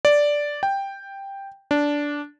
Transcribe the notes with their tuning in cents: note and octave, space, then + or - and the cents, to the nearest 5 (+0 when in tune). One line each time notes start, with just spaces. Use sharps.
D5 -5
G5 +5
D4 -10